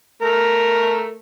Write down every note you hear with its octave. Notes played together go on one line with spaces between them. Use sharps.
A3 A#4